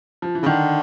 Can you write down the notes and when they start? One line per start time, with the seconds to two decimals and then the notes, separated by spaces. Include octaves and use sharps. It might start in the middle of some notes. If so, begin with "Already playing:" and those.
0.22 F3
0.35 E3
0.42 C#3
0.46 D3 D#3